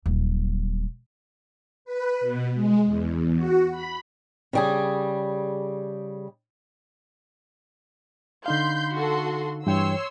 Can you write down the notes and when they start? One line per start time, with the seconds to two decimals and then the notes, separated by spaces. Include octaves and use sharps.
0.06 D#1 F#3
1.85 B4
2.21 B2
2.54 G#3
2.86 E2
3.37 F#4
3.71 B5
4.53 C#3 G3 G#4
8.46 D3 D#4 F5 B5 C6 G6
8.93 F#4 A4 C6
9.67 G2 E3 C#5 G5 C6 E6